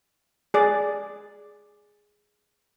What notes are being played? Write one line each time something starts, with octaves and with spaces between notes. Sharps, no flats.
G#4 D5